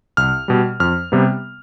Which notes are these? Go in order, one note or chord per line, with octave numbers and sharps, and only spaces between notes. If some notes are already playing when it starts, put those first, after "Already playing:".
C2 F6
B2 G3
F2 F6
C3 G3 B3